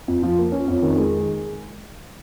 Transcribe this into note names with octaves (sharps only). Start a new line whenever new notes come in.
F2
F3
A#3
C#4
F2
D#3
G#3